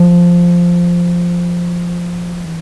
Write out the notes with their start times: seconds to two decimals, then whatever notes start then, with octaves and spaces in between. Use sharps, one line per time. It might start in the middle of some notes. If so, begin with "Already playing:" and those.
Already playing: F3
2.45 E3